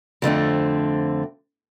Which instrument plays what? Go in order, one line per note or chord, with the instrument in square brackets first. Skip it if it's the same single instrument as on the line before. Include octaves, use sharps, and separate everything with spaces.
[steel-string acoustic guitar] F2 D3 A3 C4